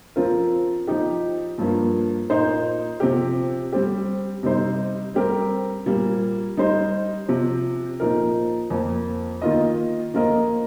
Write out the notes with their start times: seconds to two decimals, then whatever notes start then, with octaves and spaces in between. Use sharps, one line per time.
0.16 F3 C4 F4 A#4
0.87 F3 D#4 G4
1.58 G2 F3 A#3
2.30 A#2 A#3 D#4 C5
3.00 C3 F3 C4 G4
3.72 G3 C4 G4
4.43 C3 G3 D#4 C5
5.15 G3 C4 G4 A#4
5.86 A#2 G3 A#3
6.57 G3 D#4 C5 D#5
7.28 C3 F3 C4
8.00 A#2 F3 D#4 A#4
8.70 F2 F3 A#3
9.42 D#3 A#3 F4 D#5
10.14 F3 A#3 F4 A#4 D#5